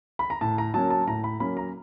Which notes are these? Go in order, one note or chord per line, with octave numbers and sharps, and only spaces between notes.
B5
A#5
A2 A5
A#5
F#3 A#3 C#4 A5
A5
A2 A#5
B5
F#3 A#3 C#4 B5
A#5